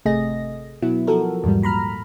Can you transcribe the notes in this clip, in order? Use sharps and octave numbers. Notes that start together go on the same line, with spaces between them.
G#1 C3 A3 G#4 D#5 A#6
B2 F#3 B3 E4
F3 F#4 A4 A#4
E2 G#2 G3
A#2 A#5 B5 F6